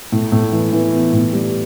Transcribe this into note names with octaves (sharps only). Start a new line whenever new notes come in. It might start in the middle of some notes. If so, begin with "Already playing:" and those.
A2
A2
E3
E3
B3
A2
G3